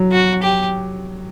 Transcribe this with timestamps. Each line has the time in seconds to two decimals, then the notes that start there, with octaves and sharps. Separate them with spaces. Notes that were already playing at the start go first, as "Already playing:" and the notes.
Already playing: F#3
0.12 F#4
0.43 G4